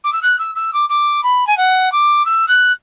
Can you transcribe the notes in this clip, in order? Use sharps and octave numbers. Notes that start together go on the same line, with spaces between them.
D6
E6
F#6
E6
E6
D6
D6
B5
G#5
F#5
D6
E6
F#6